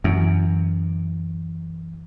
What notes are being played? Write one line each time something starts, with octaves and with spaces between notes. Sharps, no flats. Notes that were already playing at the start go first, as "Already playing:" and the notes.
F#2 E3